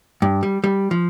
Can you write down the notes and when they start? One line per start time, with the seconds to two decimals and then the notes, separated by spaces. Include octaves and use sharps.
0.22 G2
0.43 G3
0.64 G3
0.91 F3